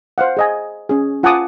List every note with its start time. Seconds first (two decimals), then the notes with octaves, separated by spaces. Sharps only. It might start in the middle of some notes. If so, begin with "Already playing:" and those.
0.18 C5 F5 F#5
0.37 G#4 D#5 G#5
0.89 C#4 G#4
1.23 F4 F#5 G#5 A5 D6 D#6